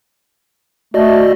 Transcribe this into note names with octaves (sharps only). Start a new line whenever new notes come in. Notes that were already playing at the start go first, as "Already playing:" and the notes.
A3 F#4 D5 D#5